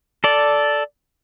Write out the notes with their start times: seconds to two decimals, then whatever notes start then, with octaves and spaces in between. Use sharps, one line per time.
0.24 A4 D5